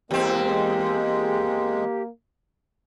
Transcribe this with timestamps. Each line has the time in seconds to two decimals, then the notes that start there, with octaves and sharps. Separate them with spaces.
0.11 E2 G#3 A#3 C4 G4